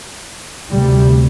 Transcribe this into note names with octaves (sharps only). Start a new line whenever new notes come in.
D2 C3 G3